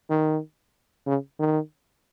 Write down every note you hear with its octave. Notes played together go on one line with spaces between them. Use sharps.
D#3
C#3
D#3